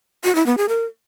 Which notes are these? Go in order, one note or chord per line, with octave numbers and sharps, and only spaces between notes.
F#4
E4
B3
G#4
A#4